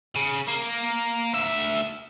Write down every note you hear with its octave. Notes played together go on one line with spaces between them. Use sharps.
C#3
A#3
D2 E5